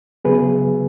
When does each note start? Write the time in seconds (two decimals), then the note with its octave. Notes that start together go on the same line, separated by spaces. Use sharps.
0.25 C#3 F#3 B3 G#4 B4